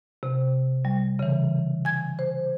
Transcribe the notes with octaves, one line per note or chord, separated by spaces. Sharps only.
C3
G3
C#3 E3
G#5 G#6
C5